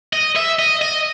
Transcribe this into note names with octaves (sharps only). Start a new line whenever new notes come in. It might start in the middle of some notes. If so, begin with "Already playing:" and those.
D#5
E5
D#5
D#5